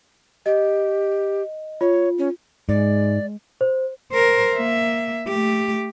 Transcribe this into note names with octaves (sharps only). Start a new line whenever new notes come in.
G4 D#5
F4 C#5
C#4
G#2 G#3 D5
C5
A#4 C5
A#3 E5
A3 G4